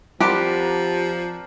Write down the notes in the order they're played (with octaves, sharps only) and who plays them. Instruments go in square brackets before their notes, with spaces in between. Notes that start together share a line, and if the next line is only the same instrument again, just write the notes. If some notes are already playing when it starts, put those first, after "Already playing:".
[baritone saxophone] F3 [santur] C4 D4 A#4 [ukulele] G4 [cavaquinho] C5 F#5 B5